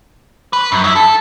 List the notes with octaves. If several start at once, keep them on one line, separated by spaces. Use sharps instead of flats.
B4
F#2
D#4 E4
A4